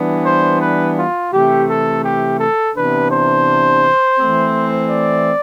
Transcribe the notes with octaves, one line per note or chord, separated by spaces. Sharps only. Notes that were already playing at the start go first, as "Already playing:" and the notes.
Already playing: E3 G3 B3 D4
C5
B4
F4
C3 E3 A3 G4
A4
G4
A4
C3 E3 B3 D4 B4
C5
E3 A3 C4
D5